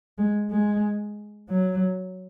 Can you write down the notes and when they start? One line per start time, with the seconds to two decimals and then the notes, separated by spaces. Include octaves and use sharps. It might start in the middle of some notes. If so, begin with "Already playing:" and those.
0.18 G#3
0.50 G#3
1.48 F#3